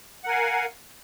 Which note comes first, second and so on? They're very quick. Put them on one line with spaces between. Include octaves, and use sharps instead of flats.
F#5 A#4 G#5 F5